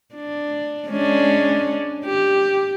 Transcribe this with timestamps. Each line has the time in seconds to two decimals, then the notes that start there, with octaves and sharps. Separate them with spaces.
0.15 D4
0.89 G#3 C#4 D4
2.06 G4